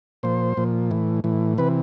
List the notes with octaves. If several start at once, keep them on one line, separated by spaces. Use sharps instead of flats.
A#2 F3 C5
A#2 F3
A2 E3
A2 E3
C3 E3 B4